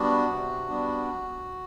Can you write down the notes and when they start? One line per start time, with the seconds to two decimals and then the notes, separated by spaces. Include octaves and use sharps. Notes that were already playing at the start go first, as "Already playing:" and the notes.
Already playing: G3 B3 D4 F#4
0.26 C3
0.68 G3 B3 D4